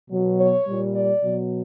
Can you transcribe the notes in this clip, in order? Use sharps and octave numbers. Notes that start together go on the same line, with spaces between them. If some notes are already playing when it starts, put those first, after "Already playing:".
B2 F#3
C#5
A#2 G3
D5
B2 F#3